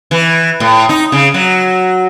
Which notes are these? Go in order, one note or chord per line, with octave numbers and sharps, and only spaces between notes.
E3
A2
D#4
C#3
F#3